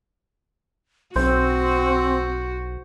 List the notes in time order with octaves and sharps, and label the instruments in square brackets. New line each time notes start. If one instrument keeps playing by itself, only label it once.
[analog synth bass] B1 [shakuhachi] C4 [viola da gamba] F#4 [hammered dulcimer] C5